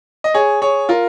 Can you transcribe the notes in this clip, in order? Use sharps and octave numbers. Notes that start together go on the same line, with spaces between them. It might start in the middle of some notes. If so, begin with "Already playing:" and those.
D#5
G#4 C#5
G#4 C#5
F4 A#4